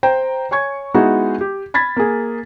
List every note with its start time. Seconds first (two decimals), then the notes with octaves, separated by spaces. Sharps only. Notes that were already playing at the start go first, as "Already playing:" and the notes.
0.03 C5 G5 A#5
0.51 C#5 G#5 C#6 G#6
0.94 G#3 B3 D#4 E4 F#4 G#4
1.41 G4
1.74 B5 G#6 A6 B6
1.96 A#3 G#4